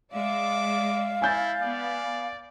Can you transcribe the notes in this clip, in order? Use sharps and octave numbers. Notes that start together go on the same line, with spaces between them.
G#3 D5 E5 F5 D6
E4 G#5 G6 A6
B3 D5